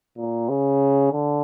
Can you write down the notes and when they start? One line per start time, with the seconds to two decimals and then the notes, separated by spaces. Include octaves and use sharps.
0.18 A#2
0.49 C#3
1.12 D3